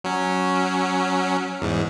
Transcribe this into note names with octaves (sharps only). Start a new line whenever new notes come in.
F#3 C#4
E2 G#2